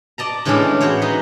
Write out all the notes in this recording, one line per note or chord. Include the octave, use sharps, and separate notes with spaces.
D5 D#5 A5 A#5
A2 E3 G#3 C#4 D4 E4
B3 F#4 G#4 C5 C#5
D#4 B4